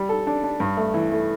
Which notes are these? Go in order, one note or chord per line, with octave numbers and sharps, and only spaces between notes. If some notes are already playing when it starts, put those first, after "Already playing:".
Already playing: G3
A4
D4
D4
G2
A3
E3
A3